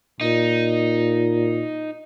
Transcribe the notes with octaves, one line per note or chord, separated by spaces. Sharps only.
A#2 D#4